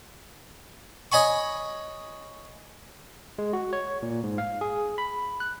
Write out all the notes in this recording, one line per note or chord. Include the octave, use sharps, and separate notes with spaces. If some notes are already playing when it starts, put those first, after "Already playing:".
C#5 D#5 G#5 B5 C#6
G#3
F#4
C#5
A#2
G#2
F5
G#4
B5
F#6